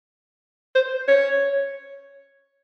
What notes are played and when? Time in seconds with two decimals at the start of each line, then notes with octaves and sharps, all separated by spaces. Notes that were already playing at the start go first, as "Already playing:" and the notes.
0.75 C5
1.08 C#5